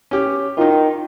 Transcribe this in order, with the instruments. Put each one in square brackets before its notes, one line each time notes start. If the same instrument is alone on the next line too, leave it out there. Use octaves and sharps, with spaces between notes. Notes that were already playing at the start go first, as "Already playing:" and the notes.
[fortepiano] C#4 G4
[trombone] D#3 [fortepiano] D#4 F4